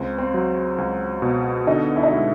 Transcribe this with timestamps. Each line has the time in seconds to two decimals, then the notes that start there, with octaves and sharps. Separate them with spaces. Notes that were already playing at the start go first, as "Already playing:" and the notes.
Already playing: C#2 C4
0.18 C4
0.34 F#3
0.78 C#2
1.22 B2
1.67 D3 D#4
1.96 E4
2.03 D#4
2.11 G#3 E4